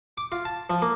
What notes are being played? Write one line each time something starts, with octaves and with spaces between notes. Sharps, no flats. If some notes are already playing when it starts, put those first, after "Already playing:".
D6
F4
A5
F3
A#3